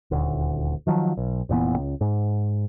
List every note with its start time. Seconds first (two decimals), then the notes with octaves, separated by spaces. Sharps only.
0.11 D#1 D2
0.87 D#3 F3 F#3
1.17 B1
1.49 F1 A#2 E3 B3
1.76 C#2
2.01 G#2